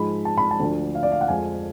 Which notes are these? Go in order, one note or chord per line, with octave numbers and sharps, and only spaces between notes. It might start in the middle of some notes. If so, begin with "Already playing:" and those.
Already playing: G#2 F3 G#3 B5
A5
B5
A5
D2 D3 F3 A3
F5
D5
F5
F#5
F2 F3 G#3 G#5